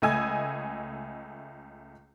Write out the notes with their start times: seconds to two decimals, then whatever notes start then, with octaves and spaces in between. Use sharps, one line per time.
0.02 C#2 A3 D#5 G#5 E6 G#6